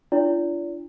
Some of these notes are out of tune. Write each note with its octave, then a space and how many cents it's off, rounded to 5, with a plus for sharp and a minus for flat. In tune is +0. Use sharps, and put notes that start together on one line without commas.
D4 +0 F4 -35 D5 -40